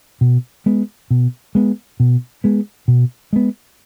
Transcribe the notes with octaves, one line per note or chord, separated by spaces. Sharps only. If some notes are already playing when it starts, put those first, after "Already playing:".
B2
G#3 B3
B2
G#3 B3
B2
G#3 B3
B2
G#3 B3